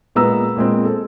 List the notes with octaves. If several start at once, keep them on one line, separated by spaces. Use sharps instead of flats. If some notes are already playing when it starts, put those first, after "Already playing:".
A#2 G#3 B3 A#5 E6
A#2 G#3 C4
A4